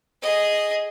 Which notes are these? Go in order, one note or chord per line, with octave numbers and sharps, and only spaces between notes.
G#4 D#5